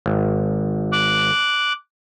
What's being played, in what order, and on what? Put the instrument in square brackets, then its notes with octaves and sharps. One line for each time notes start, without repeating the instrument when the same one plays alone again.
[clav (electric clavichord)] G#1
[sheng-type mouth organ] D6 F#6